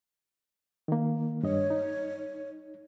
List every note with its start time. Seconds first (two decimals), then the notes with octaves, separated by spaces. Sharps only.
0.88 D#3 A#3
1.43 G2 C#5 D#5
1.70 D#4